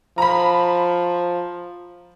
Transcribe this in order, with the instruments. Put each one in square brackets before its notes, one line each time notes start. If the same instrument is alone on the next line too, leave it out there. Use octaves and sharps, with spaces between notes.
[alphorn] F3 [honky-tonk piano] A#5 B5